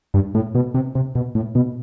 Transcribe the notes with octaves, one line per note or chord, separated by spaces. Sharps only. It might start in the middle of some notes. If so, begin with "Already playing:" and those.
G2
A2
B2
C3
C3
B2
A2
B2